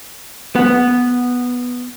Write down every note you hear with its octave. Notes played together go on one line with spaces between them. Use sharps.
B3